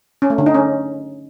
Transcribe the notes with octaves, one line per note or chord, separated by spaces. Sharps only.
C#4
A3
D3
D#4
C#4